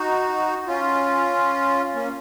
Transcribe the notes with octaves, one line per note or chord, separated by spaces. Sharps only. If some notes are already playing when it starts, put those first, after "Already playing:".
Already playing: D#4 F#4
C#4 F4
A#3 C#4